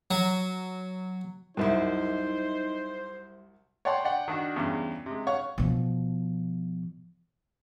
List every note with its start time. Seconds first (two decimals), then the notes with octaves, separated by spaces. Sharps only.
0.11 F#3
1.57 C2 F#2 G3 D#4 E4 C5
3.85 C#5 D5 F#5 G5 A5 C6
4.05 D5 F#5 G5
4.28 D#3 D4 F#4
4.56 E2 G2 C#3
5.06 C3 G#3
5.27 C#5 F5 F#5 C#6
5.58 B2 F3